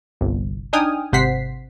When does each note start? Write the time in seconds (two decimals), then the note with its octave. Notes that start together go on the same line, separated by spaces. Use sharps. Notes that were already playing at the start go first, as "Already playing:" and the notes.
0.21 G1 C2
0.73 D4 D#4 G5 G#5 D#6 F6
1.12 G#1 C3 C5 F#5 B6 C7